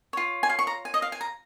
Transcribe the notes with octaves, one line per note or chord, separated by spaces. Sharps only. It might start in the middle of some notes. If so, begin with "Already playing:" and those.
F4 C#5
G#5
F5
C#6
A#5
G#5
D#5
F5
G#5
A#5